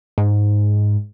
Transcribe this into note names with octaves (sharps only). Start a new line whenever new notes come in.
G#2